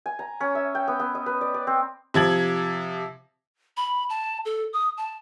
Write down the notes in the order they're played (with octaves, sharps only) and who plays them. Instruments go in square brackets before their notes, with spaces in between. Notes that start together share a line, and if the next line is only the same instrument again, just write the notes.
[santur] G#5
A#5
C#4
E5
G5
B3
B3
D#5
B4
D5
D5
C4
[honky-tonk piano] C3 F3 G#6 F#7
[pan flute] B5
A5
A4
D#6
A5